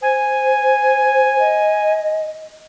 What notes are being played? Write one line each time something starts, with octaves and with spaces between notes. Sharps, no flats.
C5 G#5
D#5